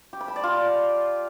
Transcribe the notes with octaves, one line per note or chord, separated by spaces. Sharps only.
G4
B5
A5
D5
F4